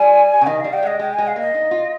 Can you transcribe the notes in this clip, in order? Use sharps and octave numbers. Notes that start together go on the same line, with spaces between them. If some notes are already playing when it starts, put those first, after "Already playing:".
Already playing: G3 G#5
C#3
D#3 D#5
G3 F5
G5
G#3 D#5
G#3 G5
G#3 G#5
F5
A#3 D#5
D#4
F4